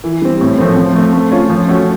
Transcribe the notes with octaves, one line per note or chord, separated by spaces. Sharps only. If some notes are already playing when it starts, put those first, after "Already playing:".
E3
G3 C4
A2
F3 A3 C4
F3
A3 C4
A3
C#4 F4
F3
A3 C#4 F#4